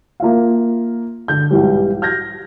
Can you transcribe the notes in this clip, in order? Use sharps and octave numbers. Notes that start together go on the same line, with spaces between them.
A#3 F4 E5 F5
D3 G6
B1 G#2 E3 G3
F6 G6 G#6 A#6